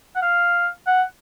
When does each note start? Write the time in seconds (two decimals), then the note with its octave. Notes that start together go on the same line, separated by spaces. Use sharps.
0.15 F#5
0.22 F5
0.87 F#5